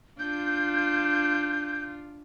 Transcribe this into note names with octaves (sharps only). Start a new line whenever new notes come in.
D4 F4 G6